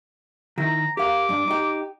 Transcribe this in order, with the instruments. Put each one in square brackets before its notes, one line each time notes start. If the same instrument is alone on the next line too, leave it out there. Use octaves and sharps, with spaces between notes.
[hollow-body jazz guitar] D#3 E4 [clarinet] A#5
[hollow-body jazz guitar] G4 A#4 F5 [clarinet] D6
[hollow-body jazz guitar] G2 D4
D#4 G4